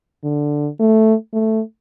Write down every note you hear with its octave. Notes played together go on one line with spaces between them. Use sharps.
D3
A3
A3